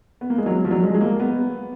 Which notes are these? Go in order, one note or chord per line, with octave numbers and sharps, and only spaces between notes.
B3
A#3
G#3
F#3
F3
F#3
G#3
G#3
A#3
B3